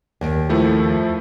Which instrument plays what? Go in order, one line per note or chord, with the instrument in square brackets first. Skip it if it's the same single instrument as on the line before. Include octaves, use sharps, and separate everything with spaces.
[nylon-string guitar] D#2
[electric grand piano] F3 A3 E4